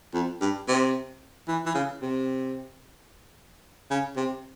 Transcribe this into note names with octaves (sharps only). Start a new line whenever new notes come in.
F2
G2
C3
E3
E3
C#3
C3
C#3
C3